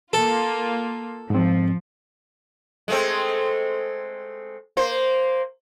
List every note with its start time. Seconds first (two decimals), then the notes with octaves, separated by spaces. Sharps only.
0.13 A#3 F4 A4
1.30 G#2 F3 C4
2.88 G#3 A3 C4
4.77 A#3 C5